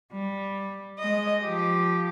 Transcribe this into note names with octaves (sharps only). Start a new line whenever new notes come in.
G3
G#3 D#5
F3 G4